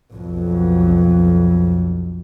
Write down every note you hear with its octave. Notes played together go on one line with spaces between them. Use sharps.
B1 F2